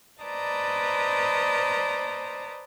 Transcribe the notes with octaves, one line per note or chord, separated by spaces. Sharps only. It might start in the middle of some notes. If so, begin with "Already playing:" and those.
B4 C5 D5 D#5 A5 A#5